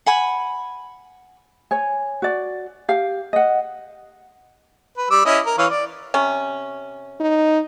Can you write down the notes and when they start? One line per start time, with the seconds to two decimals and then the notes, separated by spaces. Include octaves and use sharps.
0.06 F#5 G#5 B5
1.71 C#5 G#5
2.22 F#4 D5
2.88 G4 F5
3.33 D#5 F#5
4.98 B4
5.11 G3 D6 E6
5.25 C#4 E4 D#5
5.46 A#4
5.58 E3 C#5 F5
5.70 D5
6.14 C3 C#4
7.20 D#4